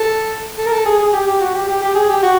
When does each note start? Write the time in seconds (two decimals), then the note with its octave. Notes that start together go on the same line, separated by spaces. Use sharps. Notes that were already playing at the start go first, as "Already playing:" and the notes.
Already playing: A4
0.58 A4
0.66 A#4
0.72 A4
0.86 G#4
0.99 G#4
1.13 G4
1.27 G4
1.41 F#4
1.55 G4
1.68 G4
1.82 G4
1.95 G#4
2.09 G4
2.23 F#4